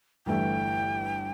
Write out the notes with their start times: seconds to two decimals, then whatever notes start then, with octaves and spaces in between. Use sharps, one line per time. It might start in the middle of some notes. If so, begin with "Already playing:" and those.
0.26 G1 G2 E3 A3 G5